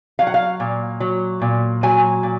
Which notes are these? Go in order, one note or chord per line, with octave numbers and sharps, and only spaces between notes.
F#3 F5
F#5
F5
A#2
F#3
A#2
F#3 G#5
A#2